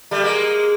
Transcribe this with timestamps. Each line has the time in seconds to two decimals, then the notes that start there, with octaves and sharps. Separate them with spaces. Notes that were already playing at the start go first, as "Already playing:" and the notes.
0.11 G3 A3
0.24 G#3 A#3